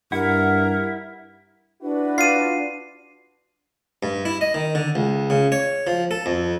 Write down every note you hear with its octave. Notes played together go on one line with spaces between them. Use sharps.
G2 E4 A#4 F#5
D4 E4 F#4 B4
F4 D5 C7 D#7
G2
E4
D#5
D#3
D3
C#2
C#3
C#5
F3
A4
F2